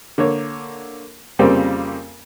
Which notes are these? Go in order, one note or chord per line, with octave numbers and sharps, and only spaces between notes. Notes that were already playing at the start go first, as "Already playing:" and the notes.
D3 A#3 C#5
F2 C#3 G3 A#3 C4